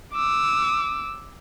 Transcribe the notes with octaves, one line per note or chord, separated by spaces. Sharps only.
D6 E6